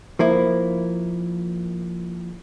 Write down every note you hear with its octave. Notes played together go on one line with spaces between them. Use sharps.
F3 A#3 E4